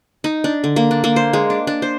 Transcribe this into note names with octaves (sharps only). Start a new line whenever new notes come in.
D#4
D4
D3
A#3
D4
A#3
C5
G#3
D4
D4
C5